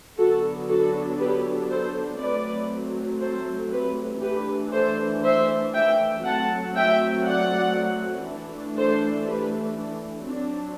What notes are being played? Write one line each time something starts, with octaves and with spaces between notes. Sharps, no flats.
D3 F#3 B3 D4 F#4 A4
F#4 A4
G4 B4
A4 C5
F#3 A3 C4 B4 D5
A4 C5
G4 B4
E3 A3 D4 G4 B4
A4 C5
C5 E5
E5 G5
F#3 A3 C4 F#5 A5
E5 G5
D5 F#5
E3 A3 D4
A4 C5
G4 B4
D4
F#3 C4 D4